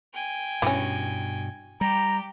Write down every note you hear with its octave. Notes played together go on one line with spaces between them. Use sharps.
G5 G#5
G2 B2 E3 C#4
G3 G4 A#5